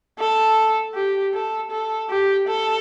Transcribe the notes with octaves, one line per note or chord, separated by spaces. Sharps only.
A4
G4
A4
A4
G4
A4